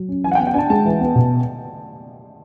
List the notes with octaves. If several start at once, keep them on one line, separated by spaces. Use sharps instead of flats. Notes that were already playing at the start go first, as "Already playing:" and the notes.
Already playing: F#3
C#4
E3 G#5
F#5
G5
B3
G5
D4 G#5 A5
G#3 A5
E3
B3
B2